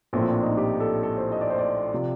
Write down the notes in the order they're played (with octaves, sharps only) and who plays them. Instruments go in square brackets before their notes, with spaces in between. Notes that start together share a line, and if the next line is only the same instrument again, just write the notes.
[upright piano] A#1 A2 F3 C4
D4
D#4
G4
A4
A4
C5
D#5
D5
C5
D5
C3 F3